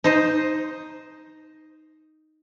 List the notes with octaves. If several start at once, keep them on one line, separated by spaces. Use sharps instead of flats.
D#4 C5 D#5